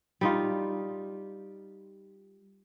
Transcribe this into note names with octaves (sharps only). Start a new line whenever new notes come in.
G3 D#4 F4